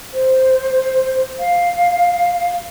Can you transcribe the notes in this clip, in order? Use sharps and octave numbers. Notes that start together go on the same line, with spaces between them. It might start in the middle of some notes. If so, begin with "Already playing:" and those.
C5
F5